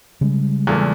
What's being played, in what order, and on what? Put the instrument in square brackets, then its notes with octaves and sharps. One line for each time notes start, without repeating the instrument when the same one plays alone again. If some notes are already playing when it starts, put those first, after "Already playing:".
[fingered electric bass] C#3 G3 G#3
[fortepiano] E2 A#2 A3